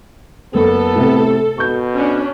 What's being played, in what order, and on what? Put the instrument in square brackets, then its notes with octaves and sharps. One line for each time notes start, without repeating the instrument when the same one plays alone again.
[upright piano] F#1 [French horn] B3 [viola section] A4
[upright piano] A2 C3
[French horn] B2 [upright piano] C#6 G6
[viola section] C#4 D4